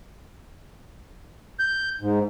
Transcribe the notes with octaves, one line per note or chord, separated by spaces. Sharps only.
G6
G#2